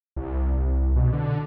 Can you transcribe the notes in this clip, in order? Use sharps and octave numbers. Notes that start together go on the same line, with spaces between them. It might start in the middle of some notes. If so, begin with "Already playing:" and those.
C2
C2
B2
D3